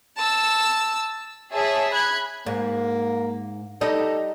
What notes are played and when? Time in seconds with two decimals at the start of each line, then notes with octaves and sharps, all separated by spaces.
0.17 A5 E6
1.52 G#4 C#5 E5 A5
1.93 B5 F#6 G#6
2.46 G#2 A#3
3.81 G3 D#4 A4 D#5